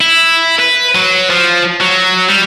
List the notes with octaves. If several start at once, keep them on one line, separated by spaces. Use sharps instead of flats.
E4
B4
F#3
F3
F#3
G3